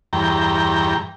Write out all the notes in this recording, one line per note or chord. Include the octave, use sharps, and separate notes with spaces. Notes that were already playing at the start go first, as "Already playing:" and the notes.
E2 G2 G5 A#5